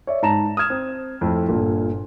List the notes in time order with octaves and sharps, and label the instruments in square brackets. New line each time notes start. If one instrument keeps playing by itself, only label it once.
[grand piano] C#5 D5 E5
G#2 A5 A#5 E7
D#6 F6 G#6 E7
C4
F2 A2 C4
G1 A#2 D3